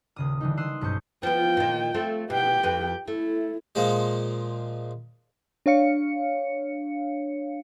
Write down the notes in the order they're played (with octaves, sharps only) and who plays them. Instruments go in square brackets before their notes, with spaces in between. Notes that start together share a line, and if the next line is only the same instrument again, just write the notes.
[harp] D#1 C#3 D#6
D3 E3 G3 D#4
C6 D#6 E6 F#6 C7
B1 G2 C#4 C5 C#6 G6
[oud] F3 B3 [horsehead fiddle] G5
[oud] A#2 D#3
A3 C4 F4
[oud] B2 [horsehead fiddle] G4 G5
[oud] F2 B4
[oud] A3 [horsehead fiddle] E4
[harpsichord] A#2 F3 G#3
[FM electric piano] D4 C#5 F5 C#7